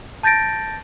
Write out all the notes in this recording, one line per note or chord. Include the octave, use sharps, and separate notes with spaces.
A5 G6 A6 A#6 D7